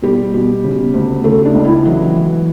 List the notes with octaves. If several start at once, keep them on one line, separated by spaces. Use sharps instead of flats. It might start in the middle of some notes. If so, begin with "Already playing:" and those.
B2 G3 G4
B2
C#3
D2
C#3 A3 A4
D4
C#2
E4
E3 F#3 F#4
E3